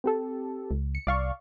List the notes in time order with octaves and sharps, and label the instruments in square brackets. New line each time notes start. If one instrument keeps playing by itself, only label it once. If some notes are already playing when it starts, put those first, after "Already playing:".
[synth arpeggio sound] C4 G4 A4
[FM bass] C#2
[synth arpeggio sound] C#7
[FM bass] C2 [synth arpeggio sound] D5 F5 C#6